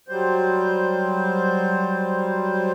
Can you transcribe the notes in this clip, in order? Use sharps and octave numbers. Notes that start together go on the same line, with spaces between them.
F#3 G3 C5